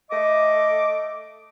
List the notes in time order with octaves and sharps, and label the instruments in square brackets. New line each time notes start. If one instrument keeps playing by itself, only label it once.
[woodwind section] A3 D#5 D6